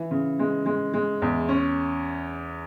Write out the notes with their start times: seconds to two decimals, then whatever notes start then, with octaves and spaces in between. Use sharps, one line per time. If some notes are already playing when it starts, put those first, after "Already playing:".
Already playing: E3
0.11 C#3
0.39 G#3
0.66 G#3
0.94 G#3
1.22 E2
1.49 C#4